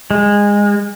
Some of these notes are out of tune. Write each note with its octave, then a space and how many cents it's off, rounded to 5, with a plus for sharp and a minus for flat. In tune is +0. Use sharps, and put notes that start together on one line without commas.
G#3 -20